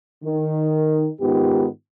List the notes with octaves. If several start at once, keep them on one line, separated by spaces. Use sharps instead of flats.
D#3
G#2 D#3 B3 F4 G4